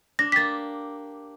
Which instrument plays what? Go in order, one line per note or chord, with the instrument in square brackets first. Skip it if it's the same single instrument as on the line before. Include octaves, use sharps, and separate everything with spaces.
[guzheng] D4 [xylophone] A#6
[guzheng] A#3 G4 [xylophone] A6 B6